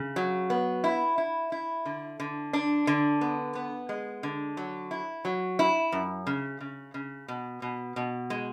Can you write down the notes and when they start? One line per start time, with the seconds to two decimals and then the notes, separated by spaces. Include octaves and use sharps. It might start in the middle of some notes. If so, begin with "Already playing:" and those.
Already playing: C#3
0.16 F#3
0.50 B3
0.84 E4
1.18 E4
1.52 E4
1.86 D3
2.20 D3
2.53 D4
2.87 D3
3.21 B3
3.55 B3
3.89 G#3
4.23 D3
4.57 F#3
4.91 E4
5.25 F#3
5.59 E4
5.92 F#2
6.27 C#3
6.60 C#3
6.94 C#3
7.28 B2
7.62 B2
7.96 B2
8.30 G#3